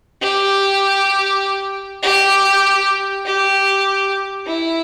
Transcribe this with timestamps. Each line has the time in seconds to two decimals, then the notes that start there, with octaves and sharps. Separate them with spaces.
0.21 G4
2.03 G4
3.26 G4
4.47 E4